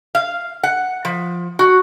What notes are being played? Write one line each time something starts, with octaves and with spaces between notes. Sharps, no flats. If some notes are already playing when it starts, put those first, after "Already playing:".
F5
F#5
F3
F#4